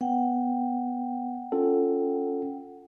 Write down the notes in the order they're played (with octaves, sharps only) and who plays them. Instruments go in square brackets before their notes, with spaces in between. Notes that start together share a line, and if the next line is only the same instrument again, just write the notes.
[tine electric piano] B3 [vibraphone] F#5 G5
[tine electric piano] C#4 F4 A4